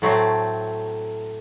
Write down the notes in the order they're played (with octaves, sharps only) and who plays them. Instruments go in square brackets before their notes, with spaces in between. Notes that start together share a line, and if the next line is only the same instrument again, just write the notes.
[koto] A2 F#3 A3 C4